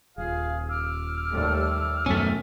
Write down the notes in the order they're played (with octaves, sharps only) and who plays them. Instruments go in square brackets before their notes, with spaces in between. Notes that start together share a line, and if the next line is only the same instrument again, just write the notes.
[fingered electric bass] D#1 [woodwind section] F4 G#4 F5
[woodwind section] D6 E6 F6
[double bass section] D#2 G3 A3
[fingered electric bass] F#2 B2 [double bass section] D#3 [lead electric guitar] A3 C#4